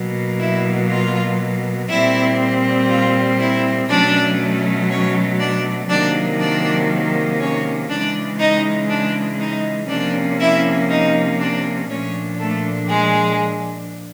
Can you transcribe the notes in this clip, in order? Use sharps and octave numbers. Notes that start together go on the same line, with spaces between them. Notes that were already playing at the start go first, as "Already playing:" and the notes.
Already playing: B2 F#3 A#3
E4 E5
F4 F5
A#2 G3 C4 E4 E5
F4 F5
E4 E5
B2 F#3 A3 C#4 D4 D5
C#4 C#5
D4 D5
C3 D#3 F#3 A#3 D4 D5
D4 D5
C#4 C#5
C#3 E3 G#3 D4 D5
D#4 D#5
D4 D5
D#4 D#5
C3 F3 A#3 C#4 D4 D5
E4 E5
D#4 D#5
D4 D5
A#2 F3 A3 C#4 D4 C#5
A3 A4
G#3 G#4